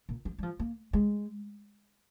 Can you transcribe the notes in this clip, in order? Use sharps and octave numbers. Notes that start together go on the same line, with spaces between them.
A#2
F3
G3
F3
A#3
G#3